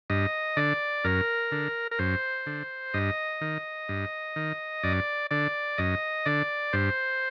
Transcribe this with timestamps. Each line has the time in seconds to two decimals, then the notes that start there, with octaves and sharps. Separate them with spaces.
0.10 G2 D#5
0.57 D3 D5
1.04 F#2 A#4
1.52 D3
1.91 A#4
1.99 F#2 C5
2.46 D3
2.94 G2 D#5
3.41 D#3
3.89 G2
4.36 D#3
4.83 F#2 D5
5.31 D3 D5
5.78 F#2 D#5
6.26 D3 D5
6.73 G2 C5